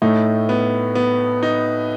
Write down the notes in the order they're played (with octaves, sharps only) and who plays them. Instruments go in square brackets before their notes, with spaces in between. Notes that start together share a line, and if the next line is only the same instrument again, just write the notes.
[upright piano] A2 A3 [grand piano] D#4
[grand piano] B3
B3
D#4